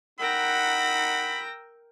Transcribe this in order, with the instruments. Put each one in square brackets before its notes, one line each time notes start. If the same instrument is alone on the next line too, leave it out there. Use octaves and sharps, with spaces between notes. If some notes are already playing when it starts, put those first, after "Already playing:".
[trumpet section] D#4 F#5 [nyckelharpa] A#4 G5 [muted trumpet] B5 [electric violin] E6 A#6